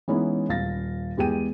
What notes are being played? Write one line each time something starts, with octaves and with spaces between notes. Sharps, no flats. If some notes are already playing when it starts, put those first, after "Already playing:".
E3 G#3 B3 C#4 D#4 E4
D#1 F5 A6 A#6
E2 G#3 G4 G#4 G5 D#7